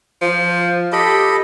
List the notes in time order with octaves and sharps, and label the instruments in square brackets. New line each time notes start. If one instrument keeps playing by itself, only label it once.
[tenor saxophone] F3
[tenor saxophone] G4 [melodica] A4 D#5 B5